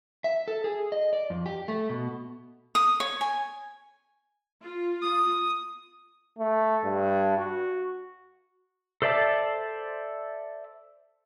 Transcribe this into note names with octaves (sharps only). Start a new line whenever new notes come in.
E5
A4
G#4
D#5
D5
F2
G4
A3
B2
D#6
C#5
G#5
F4
D#6
A3
G2
F#4
A4 C5 D5 E5 A5